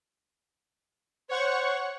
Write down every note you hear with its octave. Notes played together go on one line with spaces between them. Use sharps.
C5 C#5 F#5 C#6